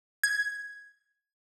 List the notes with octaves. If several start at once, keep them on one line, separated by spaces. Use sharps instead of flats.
G#6